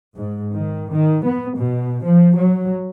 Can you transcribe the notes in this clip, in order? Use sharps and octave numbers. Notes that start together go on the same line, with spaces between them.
G#2
D#3
D#3
B3
B2
F3
F#3